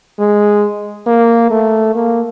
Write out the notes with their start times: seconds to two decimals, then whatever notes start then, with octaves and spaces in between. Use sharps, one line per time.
0.19 G#3
1.07 A#3
1.51 A3
1.96 A#3